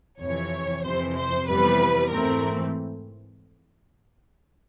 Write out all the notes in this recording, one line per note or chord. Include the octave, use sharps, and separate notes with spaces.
F2 C3 E3 C#5
F2 C3 E3 C5
C5
F2 C3 E3 G3 B3 B4
G#2 E3 A3 C4 A#4